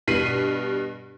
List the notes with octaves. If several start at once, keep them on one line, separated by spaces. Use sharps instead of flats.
G2 B2 B6 C7 D#7 F#7